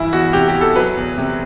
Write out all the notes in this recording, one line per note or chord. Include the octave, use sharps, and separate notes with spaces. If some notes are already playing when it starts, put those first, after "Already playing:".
Already playing: G2 E3 E4
E2 F#4
C3 G4
G4
E2
A4
F#3 B4
E2
C3